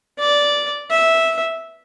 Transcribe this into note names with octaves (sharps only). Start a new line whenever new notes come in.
D5
E5